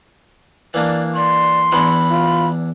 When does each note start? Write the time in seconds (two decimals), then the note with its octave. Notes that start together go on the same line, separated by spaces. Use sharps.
0.74 E3 A#3 D4 D5
1.16 D5 C6
1.72 E2 D4 E4 B5
2.10 F4